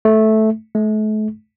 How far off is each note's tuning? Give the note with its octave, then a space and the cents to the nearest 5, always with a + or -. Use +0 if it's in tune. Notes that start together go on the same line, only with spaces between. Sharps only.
A3 -10
A3 -40